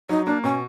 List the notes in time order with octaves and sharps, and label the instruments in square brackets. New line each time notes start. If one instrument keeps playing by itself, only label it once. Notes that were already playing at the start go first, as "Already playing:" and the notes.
[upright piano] F#3 [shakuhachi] D#4
[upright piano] A#3 [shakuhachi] D4
[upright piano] B2 [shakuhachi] C#4